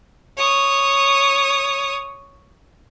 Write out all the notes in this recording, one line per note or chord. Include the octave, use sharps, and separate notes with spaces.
C#5 D#6